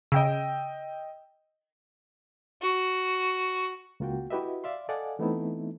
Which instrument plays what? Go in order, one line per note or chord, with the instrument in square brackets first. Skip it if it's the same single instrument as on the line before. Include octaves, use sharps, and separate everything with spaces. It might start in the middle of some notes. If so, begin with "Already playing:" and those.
[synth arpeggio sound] C#3 D7 [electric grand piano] D#5 G5 E6
[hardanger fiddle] F#4
[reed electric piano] C#2 A#3 F4 F#4 G5
E4 F#4 G4 B4 D#5 E5
D5 E5 F5 C6
A4 D5 D#5 F5 F#5 G#5
E3 A3 B3 C4 D#4 E4